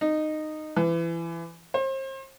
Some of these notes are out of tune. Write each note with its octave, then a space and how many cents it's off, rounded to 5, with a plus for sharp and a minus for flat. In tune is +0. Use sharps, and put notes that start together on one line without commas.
D#4 -15
E3 +25
C5 +35